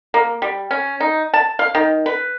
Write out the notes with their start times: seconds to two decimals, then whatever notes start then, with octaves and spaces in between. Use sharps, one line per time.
0.14 A#3
0.42 G3
0.71 C#4
1.00 D#4
1.34 A5
1.59 F5
1.75 D#3
2.06 B4